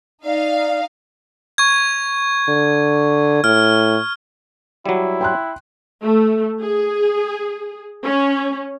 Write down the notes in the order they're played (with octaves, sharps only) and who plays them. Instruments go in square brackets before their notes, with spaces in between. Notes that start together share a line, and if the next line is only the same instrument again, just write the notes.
[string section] D#4 F5 [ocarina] D5
[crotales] C#6 G#6
[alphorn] D3
[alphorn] A2 [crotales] F6
[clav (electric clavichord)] F#3 G3 [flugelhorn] E4
[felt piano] G5 C6 F#6
[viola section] A3
G#4
C#4